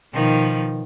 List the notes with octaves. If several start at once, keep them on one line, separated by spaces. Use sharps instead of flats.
B2 D#3 F3